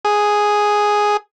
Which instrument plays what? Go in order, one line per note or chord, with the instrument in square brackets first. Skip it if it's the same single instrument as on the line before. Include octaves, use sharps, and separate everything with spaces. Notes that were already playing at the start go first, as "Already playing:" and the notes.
[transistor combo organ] G#4